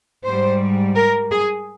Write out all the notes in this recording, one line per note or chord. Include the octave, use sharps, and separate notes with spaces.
G#2 G3 C5
A#4
G#4